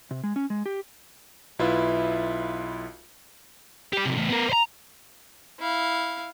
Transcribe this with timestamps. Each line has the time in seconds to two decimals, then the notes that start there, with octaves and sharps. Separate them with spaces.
0.11 C3
0.24 G#3
0.36 C#4
0.50 G#3
0.66 G4
1.59 B1 E4 F4 B4 E5
3.93 G4 D5
4.05 C3 F#3
4.17 E2 A2
4.29 B3 A#4
4.50 C5 A#5
5.59 E4 F5